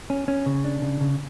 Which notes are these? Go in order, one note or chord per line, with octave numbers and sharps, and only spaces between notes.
C#4
C#4
C#3
D4
C#3
C#3